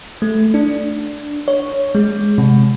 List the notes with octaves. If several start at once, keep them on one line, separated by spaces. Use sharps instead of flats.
A3
D4
C#5
G#3
C3